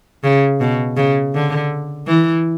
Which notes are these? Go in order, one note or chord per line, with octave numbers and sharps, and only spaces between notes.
C#3
B2
C#3
D3
E3